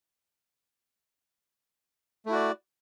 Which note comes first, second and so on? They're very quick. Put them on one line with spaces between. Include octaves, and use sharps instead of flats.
A3 E4 F#4 D5